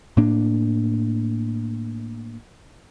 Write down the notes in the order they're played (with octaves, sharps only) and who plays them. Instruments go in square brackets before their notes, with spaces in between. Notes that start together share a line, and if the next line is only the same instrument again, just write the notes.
[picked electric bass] A2 A#3 D4